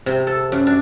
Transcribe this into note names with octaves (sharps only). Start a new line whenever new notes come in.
C3
A4
F#2
D4